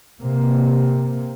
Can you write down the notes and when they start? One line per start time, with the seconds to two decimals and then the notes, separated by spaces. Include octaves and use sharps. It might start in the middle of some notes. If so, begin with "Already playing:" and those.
0.21 C3 A#3